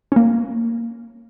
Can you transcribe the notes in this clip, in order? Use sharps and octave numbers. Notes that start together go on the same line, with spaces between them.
A#3 C#4